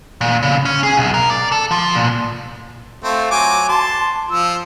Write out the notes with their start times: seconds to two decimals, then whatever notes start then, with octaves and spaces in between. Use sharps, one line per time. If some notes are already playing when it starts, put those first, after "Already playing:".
0.21 A#2
0.43 C#3
0.65 C#4
0.83 G#4
0.97 B1
1.14 A#4
1.30 D5
1.52 A4
1.71 F3
1.95 A#2
3.03 A3 C4 F4
3.31 F#3 G#5 D6
3.68 A5 C6
4.31 F3 E6